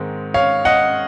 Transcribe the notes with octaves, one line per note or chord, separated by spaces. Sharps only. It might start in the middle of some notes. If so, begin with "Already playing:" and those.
Already playing: G#2 D#3 G#3 C4
C#5 F5
D#5 F#5